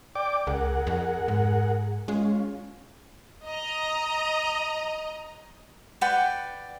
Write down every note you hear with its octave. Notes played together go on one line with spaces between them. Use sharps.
D5 G5 D6
C#2 G#4 A#4 F#5
F2
G#2
G#3 C#4 F4
D#5 A#5
B4 D5 F#5 G5